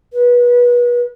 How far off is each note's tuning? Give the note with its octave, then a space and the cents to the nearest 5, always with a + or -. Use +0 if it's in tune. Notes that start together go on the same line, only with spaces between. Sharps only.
B4 -30